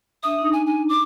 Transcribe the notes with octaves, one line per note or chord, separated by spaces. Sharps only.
D4 E5 D#6
D4 D#4
G#5
G#5
D6